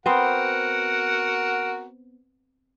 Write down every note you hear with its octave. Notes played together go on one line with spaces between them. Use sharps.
B3 C4 F#4 A#4 C5 F#5